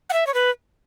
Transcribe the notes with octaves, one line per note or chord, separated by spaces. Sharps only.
F#5
E5
C#5
B4